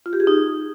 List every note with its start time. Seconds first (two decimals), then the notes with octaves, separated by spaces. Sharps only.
0.06 F4
0.13 G4
0.20 G#4
0.27 D#4